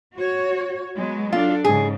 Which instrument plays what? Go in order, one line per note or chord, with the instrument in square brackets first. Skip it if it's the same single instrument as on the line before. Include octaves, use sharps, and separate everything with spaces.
[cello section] F#4 C#5
F#3 G#3 B3
[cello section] D4 A4 [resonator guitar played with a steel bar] F4
[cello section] G#2 C#3 [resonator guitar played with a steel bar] G#4